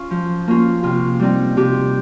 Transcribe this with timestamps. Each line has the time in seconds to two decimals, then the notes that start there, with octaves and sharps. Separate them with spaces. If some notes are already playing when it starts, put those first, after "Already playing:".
Already playing: C#4 F4
0.11 F3
0.47 A#3 C#4 F4
0.83 C3 F4
1.19 G3 C4 D#4
1.57 C3 G4